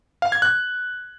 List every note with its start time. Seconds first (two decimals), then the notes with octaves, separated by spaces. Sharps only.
0.22 F5
0.32 G#6
0.42 F#6